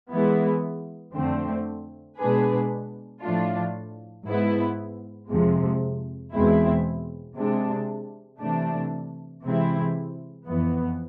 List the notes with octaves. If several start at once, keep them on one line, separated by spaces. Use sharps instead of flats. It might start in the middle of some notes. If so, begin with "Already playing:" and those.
E3 G#3 B3 E4
F2 D3 A3 C4
B2 G#3 D4 G#4 B4
A2 F3 A3 D4 F4
G#2 G#3 B3 E4 B4
F2 C3 F3 G#3
E2 B2 G#3 C4 E4
C3 G#3 D4
C3 E3 A3 D4
C3 E3 G#3 C4 E4
F2 E3 B3